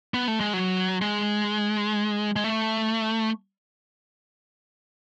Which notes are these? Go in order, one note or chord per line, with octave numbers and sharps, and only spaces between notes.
B3
A3
G#3
F#3
G#3
G#3
A3